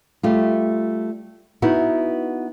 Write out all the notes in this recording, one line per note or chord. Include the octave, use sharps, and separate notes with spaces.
G3 A3 F4
B3 D#4 E4 F#4